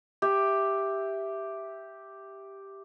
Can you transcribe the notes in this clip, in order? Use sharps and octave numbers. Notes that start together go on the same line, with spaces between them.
G4 E5